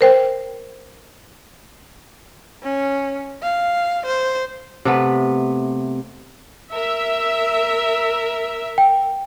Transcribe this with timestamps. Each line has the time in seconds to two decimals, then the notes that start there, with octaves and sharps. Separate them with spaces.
0.01 A#4 C5 G5
2.63 C#4
3.42 F5
4.06 C5
4.85 C3 A3 B3
6.71 A#4 E5
8.78 G5